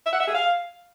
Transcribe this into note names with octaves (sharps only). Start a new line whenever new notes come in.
E5
F#5
E5
G#4
F5